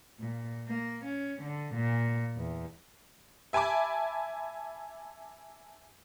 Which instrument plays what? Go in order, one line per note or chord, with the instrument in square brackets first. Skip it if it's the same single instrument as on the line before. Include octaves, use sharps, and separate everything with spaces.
[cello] A#2
A#3
C#4
D3
A#2
E2
[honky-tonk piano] E5 G#5 A5 B5 D6